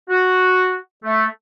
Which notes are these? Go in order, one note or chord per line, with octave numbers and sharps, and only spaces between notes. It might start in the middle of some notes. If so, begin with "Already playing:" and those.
F#4
A3